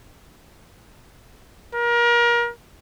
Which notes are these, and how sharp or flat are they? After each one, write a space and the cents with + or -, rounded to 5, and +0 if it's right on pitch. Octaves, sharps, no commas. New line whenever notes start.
A#4 +30